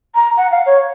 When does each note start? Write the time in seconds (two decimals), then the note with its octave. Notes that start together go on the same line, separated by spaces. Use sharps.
0.15 A#5
0.37 F#5
0.51 F5
0.66 C#5